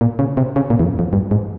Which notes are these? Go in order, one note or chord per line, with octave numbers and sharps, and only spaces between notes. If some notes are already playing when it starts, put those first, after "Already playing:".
A#2
C#3
C3
C#3
A#2
E2
F2
F2
G2
G#2